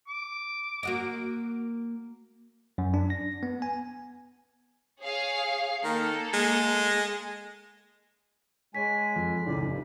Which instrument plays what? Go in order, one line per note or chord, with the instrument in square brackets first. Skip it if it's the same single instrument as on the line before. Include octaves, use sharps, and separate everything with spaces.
[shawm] D6
[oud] A#3 F#4 D#5
[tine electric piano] F#2
D4
A#6
B3
G#5
[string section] G#4 C#5 F5
[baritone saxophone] D#3 [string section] A#3 A4
[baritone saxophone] G#3
[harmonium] G#3 G#5 [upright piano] C#5 [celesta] B6
[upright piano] F2
[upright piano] C#2 A2 D#3 [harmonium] D5
[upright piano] F1 [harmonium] G2